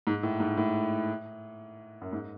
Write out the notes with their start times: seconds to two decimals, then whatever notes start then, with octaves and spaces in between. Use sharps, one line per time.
0.07 G#2
0.23 A2
0.40 G#2
0.57 A2
2.01 F#2
2.13 G#2